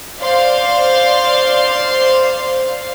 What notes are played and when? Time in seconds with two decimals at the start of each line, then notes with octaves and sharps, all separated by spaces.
0.22 C5 D5 F5 C6